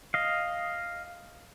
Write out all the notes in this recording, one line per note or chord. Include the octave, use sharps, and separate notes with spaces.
D#5 F5